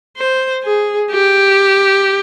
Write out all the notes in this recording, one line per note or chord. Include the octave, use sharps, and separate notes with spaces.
C5
G#4
G4